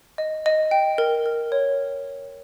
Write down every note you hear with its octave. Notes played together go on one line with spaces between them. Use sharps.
D#5
D#5
G5
A#4
A#4
C#5